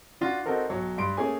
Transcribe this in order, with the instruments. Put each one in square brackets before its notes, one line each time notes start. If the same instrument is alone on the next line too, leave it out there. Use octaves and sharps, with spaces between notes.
[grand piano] D4 F4 F#4
C4 D#4 F#4 A4 A#4
B1 F#3 C#5
G2 C6 D7
A3 A#3 C#4 G#4 G#5